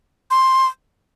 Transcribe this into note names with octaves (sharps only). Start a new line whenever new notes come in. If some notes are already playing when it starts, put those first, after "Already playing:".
C6